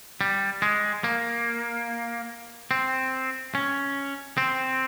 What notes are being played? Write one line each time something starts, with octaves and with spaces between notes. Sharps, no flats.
G3
G#3
A#3
C4
C#4
C4